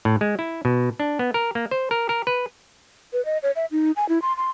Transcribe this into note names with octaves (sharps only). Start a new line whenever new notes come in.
A2
G#3
E4
B2
D4
B3
A#4
A#3
C5
A#4
A#4
B4
B4
D#5
C#5
E5
D#4
G#5
E4
C6
C6